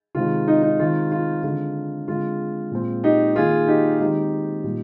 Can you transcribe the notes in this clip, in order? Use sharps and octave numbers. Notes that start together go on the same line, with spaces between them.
C3 D#3 G#3 C4 F4
D#4
D#4
D#3 G#3 C4 F4
F4
D3 G#3 C4 F4
D3 G#3 C4 F4
A#2 G#3 C4
D#4 G4
D#3 A#3 F4 G#4
D#4 G4
D#3 G#3 C4 D#4 G4
A#2 G3 C4